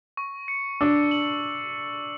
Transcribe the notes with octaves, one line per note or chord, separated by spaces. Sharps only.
C#6
C#7
D4 E6
F#7